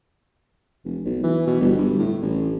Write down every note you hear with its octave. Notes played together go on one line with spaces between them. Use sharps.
F1
B1
E3
B2
G1
G2
A2
A1